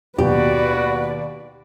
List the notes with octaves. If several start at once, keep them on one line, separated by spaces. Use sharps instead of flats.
D#2 B2 F#4 G4 B4 D5